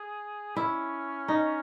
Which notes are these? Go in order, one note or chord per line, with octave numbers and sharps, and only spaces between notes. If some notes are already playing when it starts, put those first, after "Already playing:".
Already playing: G#4
C#4 E4
D#4